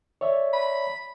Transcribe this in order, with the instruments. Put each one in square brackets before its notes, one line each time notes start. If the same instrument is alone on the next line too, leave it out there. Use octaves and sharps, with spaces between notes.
[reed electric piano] C#5 D5 E5
[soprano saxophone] B5